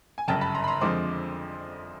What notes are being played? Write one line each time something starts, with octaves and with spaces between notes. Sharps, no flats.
G#5
G1 F#2 C#3 G5 A5
A5 B5
A#5 C6
B5
A#5 C6
F2 D3 F3 G#3 C4 C6 D6